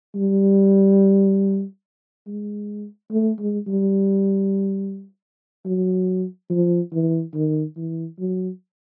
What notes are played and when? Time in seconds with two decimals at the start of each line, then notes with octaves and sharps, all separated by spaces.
0.15 G3
2.27 G#3
3.11 A3
3.40 G#3
3.68 G3
5.66 F#3
6.50 F3
6.93 E3
7.34 D#3
7.77 E3
8.19 F#3